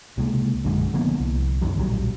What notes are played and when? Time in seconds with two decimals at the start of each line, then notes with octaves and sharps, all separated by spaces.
0.17 C#2 C3 G#3 A#3
0.64 A#1 F#2 D3 G#3
0.93 D3 F3 A#3 B3
1.20 C2
1.62 B1 F#2 D#3 F#3
1.77 D1 A#1 F#3 G3